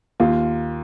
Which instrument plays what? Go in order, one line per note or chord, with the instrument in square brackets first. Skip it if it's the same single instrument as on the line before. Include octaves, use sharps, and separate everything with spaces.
[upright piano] D#2 F4